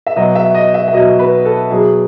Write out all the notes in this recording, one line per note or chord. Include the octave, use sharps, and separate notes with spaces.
E5
B2 F#3 D#5
E5
D#5
E5
E5
B2 F#3 D#5
B4
A4
B2 F#3 G#4